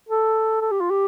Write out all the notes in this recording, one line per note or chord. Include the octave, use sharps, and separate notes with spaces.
A4
A4
G4
F4
G4